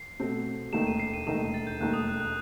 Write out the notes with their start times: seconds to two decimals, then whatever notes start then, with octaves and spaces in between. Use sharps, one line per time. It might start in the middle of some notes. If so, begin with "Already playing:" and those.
Already playing: C7
0.20 B2 A3 C4
0.72 E1 D#2 D#3 A3 D#4 E7
0.87 D#7
1.00 C7
1.13 D#7
1.27 E1 D#2 D#3 A3 D#4 E7
1.40 D#7
1.54 A6
1.67 G6
1.80 E1 D#2 D#3 A3 D#4 F#6
1.93 D#6
2.08 F#6
2.20 F#6